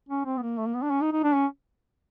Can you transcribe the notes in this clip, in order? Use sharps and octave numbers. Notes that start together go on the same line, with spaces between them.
C#4
C4
B3
A#3
A3
A#3
B3
D4
C#4
D#4
D#4
D4
C#4